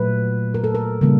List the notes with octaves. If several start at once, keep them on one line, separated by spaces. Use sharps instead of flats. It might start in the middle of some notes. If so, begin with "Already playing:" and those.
Already playing: A#2 F#3 A3 B4
A#4
A4
A#4
C#3 E3 G3 A#3